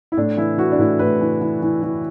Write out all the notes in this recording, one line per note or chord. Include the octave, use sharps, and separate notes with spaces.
E4
A2 D4
E3 E4
E3 F#4
D4
A2 E4
A2 B4
E3
E3
E3
E3